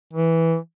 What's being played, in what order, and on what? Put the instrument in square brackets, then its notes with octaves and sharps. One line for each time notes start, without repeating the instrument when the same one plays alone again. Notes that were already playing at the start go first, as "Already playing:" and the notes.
[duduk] E3